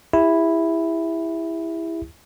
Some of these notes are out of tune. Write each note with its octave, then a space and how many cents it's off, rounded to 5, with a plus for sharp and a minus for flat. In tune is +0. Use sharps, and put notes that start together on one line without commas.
E4 +0 G4 +40